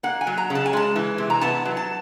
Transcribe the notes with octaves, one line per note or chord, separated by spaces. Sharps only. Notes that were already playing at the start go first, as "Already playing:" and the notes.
A#3 F#5
G#5
F#3
A#5
C#3
A5
G#5
G#3 A5
E3
C3
A#5
B3 A5
F#3
A5